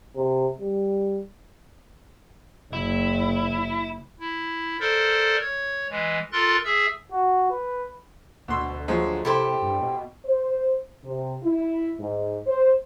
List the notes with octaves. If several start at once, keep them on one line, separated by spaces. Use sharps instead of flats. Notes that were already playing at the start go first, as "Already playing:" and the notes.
C3
G3
F#1 E4
E4
A4 A#4 C5 D5
C#5
E3 G#3
F4 A4 A#4 C6 F#6 A6
G#4 E5 E6
F#4
B4
D2 B2 C6 E6
F3 F#3 G#3
C3 E4 G4 A4 C5
G2
B2
C5
C3
E4
G#2
C5